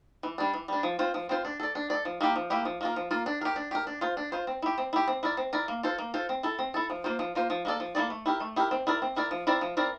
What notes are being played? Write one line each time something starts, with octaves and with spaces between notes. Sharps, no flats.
E3
G3 D4
E3
G3 D4
F3
C4 F4 C5
F3
C4 F4 C5
D4
A4 D5
D4
A4 D5
F3
A#3 E4 G4
F3
A#3 E4 G4
F3
A#3 F4 A#4
F3
A#3 F4 A#4
D4
G4 A#4
D4
G4 A#4
D4
F4 C5
D4
F4 C5
C4
E4 G4
C4
E4 G4
C4
E4 A#4 D5
C4
E4 A#4 D5
A#3
F4 A4 C5
A#3
F4 A4 C5
C4
E4 A4
C4
E4 A4
F3
A#3 F4 C5
F3
A#3 F4 C5
F3
A#3 E4 A4 D5
F3
A#3 E4 A4 D5
A3
E4 G4 A#4
A3
E4 G4 A#4
C4
E4 A#4 D5
C4
E4 A#4 D5
F3
C4 E4 A#4 D5
F3
C4 E4 A#4 D5